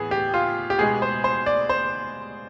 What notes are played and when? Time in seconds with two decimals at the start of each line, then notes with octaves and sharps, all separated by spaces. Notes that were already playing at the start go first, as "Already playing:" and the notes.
Already playing: A2 E3 B3 G#4
0.11 G4
0.34 F4
0.70 G4
0.78 B2 G#3 B3 G#4
1.02 C5
1.24 C5
1.46 D5
1.69 C5